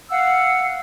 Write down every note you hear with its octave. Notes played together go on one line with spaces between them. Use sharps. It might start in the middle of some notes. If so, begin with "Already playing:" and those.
F5 F#5 E6